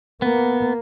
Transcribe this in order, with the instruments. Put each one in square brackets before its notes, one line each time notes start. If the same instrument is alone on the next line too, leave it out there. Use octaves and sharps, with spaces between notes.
[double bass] A#3 [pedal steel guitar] B3